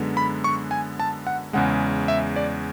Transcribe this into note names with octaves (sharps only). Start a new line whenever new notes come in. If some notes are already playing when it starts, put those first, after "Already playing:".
Already playing: F#2 D3 G#3 B3
B5
C#6
G#5
A5
F#5
E2 C#3 G#3 F#5
E5
D5